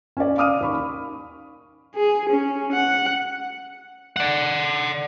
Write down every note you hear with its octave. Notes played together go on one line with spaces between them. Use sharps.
C#4 D5
F5 D6 D#6 F6 D#7
D#2 B5 C#6
G#4
C#4
F#5
D5 F#5